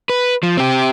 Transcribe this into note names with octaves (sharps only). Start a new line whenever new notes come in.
B4
F3
C4 G4